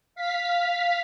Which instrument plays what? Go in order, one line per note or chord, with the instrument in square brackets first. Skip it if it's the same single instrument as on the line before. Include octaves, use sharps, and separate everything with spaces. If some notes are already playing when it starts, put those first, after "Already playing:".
[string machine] F5 B6